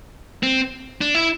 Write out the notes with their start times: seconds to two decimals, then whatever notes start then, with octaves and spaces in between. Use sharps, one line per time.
0.43 C4
1.01 D4
1.15 E4